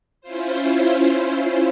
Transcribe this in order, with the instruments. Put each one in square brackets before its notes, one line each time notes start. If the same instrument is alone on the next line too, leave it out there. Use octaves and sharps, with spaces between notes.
[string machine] C#4 E4 F4 C5